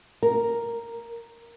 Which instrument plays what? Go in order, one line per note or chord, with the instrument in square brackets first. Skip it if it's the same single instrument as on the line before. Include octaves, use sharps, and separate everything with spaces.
[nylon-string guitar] A#4